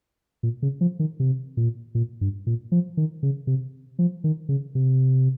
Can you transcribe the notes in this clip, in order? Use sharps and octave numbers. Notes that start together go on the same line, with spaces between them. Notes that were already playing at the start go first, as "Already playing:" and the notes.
A#2
C#3
F3
D#3
C3
A#2
A#2
G2
A#2
F3
D#3
C#3
C3
F3
D#3
C#3
C3